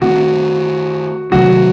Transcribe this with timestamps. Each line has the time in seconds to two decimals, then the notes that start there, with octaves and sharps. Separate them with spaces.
0.01 D#3 A3 C4 F#4
1.32 C3 D#3 F#3 A3 F#4